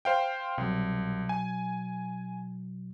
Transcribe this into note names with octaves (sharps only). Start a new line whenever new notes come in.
C5 F5 G5
C2 B2 F#3
G#5